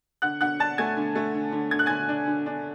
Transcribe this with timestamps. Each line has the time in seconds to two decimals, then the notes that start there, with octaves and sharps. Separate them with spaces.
0.22 D3 F#5 F#6
0.41 D3 F#5 F#6
0.59 D4 A5 A6
0.78 A3 G#5 G#6
0.97 D3
1.15 A3
1.35 D3
1.52 D3
1.71 D3 G#6
1.79 F#6
1.86 D3 G#5 G#6
2.09 D4
2.27 D3
2.46 D4